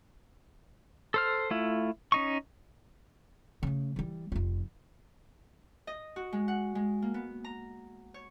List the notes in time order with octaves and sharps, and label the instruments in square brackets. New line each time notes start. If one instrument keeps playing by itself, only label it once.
[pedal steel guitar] A4 C5 F6
A3 E4 F4
C#4 D#4 C#6
[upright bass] C#3 A3
E3 G3
F1 F4
[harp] D#5
F#4
G#3
F#5
G#3
A#3
B3
A#5
C#5